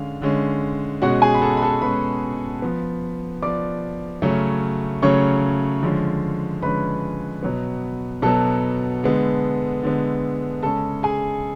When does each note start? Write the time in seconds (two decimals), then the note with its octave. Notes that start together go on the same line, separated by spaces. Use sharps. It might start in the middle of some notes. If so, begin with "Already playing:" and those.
Already playing: D3 G#3 C#4 F5
0.22 D3 G#3 C#4
1.02 B2 G#3 C#4 F#4 F#5
1.22 G#4 G#5
1.34 B5
1.42 A4 A5
1.57 B5
1.62 A4 A5
1.82 B2 G#3 C#4 B4 B5
2.62 F3 B3
3.42 F3 B3 D5 D6
4.22 C#3 F#3 A3 C#4
5.02 C#3 F#3 A3 C#4 C#5 C#6
5.82 D3 F3 G#3 C#4
6.62 D3 F3 G#3 C#4 B4 B5
7.43 B2 F#3 B3
8.22 B2 F#3 B3 A4 A5
9.03 D3 G#3 B3
9.83 D3 G#3 B3
10.63 C#3 G#3 C#4 A4 A5
11.03 G#4 G#5